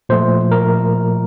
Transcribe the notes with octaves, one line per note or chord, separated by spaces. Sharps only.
A#2 F3 A3 C5
A#4